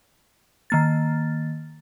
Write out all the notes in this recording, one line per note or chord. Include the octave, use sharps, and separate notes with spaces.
D#3 A#3 A6